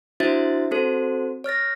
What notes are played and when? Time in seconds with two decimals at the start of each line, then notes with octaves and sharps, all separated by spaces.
0.20 D4 E4 F#4 C5 E5 A6
0.71 C4 F#4 A4 C5
1.44 C#5 F6 A6 A#6